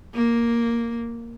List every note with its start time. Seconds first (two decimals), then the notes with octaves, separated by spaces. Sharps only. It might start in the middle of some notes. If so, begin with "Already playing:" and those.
0.14 A#3